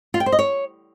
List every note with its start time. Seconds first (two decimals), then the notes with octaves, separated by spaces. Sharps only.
0.14 F4
0.20 G5
0.26 C5
0.32 D#5
0.39 C#5